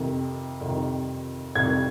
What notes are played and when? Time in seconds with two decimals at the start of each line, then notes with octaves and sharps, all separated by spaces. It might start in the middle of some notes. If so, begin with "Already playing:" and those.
Already playing: F2 C3 D#3
0.61 F2 C3 D#3
1.55 F2 C3 D#3 G#6